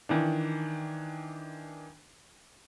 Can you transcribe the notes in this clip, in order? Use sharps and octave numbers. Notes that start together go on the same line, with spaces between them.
D#3 E3 D4